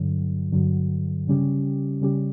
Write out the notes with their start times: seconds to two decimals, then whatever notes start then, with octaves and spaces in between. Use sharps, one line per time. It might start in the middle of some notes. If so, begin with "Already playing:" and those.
Already playing: G2 D3 F#3
0.52 G2 D3 F#3
1.27 C#3 G3 C#4 G4
2.01 C#3 G3 C#4 G4